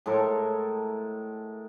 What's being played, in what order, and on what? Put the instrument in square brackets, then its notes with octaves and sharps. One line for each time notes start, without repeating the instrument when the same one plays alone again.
[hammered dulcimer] A2 G#3 A4 A#4